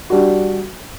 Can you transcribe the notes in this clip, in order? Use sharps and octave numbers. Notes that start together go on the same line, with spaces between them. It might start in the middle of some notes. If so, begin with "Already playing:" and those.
G3 D4 F#4